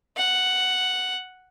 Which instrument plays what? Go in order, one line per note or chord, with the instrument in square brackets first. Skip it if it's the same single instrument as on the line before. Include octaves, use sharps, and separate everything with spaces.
[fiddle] F#5